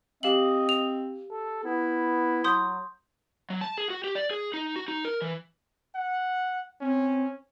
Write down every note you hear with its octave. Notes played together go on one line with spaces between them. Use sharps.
C4 G4 D#5 F5 F#7
F7
A4
B3 E4
F#3 C6 D#6 G6
F#3
A5
G#4
F#4
G4
D5
G#4
D#4
F#4
D#4
A#4
E3
F#5
C4 C#4